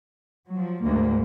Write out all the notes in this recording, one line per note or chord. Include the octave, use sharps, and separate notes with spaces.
F3 F#3
D2 G#2 A#3